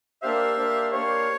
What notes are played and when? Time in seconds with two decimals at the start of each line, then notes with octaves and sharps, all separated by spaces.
0.22 A#3 D4 G4 C5 E5 F5
0.57 A#3 D4 G4 C5 F5
0.92 A#3 D4 G4 C5 C#5 F5